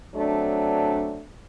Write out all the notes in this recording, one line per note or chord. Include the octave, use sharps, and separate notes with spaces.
F#3 A3 C4 D4